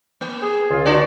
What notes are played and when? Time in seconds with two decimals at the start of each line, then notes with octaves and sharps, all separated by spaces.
0.21 A#3
0.42 G#4
0.71 C#2 D3 F4
0.85 D4 F#4 D5